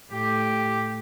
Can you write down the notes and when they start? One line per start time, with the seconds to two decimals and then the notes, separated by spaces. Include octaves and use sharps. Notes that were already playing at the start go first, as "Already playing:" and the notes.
0.12 A2 G4